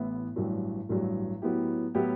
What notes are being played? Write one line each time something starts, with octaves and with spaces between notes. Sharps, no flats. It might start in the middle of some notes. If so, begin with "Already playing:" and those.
Already playing: A1 A2 E3 B3 E4
A1 G2 F#3
A1 G2 F#3
A2 F#3 B3 E4 G4
A2 F#3 B3 E4 G4